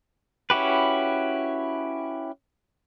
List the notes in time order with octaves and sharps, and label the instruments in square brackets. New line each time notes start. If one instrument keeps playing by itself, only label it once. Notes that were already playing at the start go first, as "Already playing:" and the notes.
[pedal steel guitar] C#4 E4 F#4 G4 B4